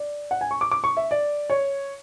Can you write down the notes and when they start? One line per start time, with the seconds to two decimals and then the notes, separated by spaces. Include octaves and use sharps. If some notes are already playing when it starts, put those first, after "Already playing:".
Already playing: D5
0.31 F#5
0.41 G#5
0.51 C#6
0.61 D6
0.71 D6
0.84 C#6
0.97 E5
1.11 D5
1.50 C#5